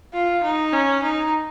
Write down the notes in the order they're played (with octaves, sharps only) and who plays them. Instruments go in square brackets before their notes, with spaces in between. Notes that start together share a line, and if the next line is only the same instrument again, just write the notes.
[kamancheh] F4
D#4
C#4
D#4